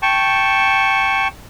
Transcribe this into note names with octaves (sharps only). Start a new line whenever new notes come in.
G5 A5 C#6